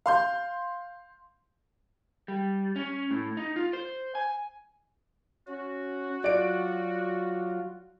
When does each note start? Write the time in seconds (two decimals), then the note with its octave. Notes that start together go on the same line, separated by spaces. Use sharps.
0.06 F5 C6 G6
2.28 G3
2.76 C#4
3.11 A2
3.37 D#4
3.56 F4
3.73 C5
4.15 G#5
5.48 C#4 F#4
6.24 F#3 F4 D5 D7